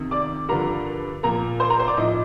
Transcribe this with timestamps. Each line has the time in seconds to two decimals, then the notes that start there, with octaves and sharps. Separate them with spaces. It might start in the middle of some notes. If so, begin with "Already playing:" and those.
Already playing: F2 C3 D#3
0.11 D5 D6
0.49 G2 D3 F3 A#4 A#5
1.23 A#2 F3 A#4 A#5
1.60 C5 C6
1.69 A#4 A#5
1.79 C5 C6
1.88 D5 D6
1.97 A2 F3 D#4 D#5